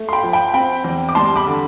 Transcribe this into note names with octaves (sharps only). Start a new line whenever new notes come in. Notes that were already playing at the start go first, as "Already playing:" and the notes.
Already playing: A3
C6
G5 B5
F3
G5 B5
C4 G5 B5
E2
D6
G3 A5 C6
B5 D6
D3